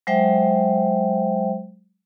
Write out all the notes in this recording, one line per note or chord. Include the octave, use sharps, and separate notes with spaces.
F#3 G#3 C5 E5 G5